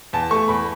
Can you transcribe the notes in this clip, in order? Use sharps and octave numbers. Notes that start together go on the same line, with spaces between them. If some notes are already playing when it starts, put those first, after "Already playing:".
E2 A5
A3 C#6
E2 B5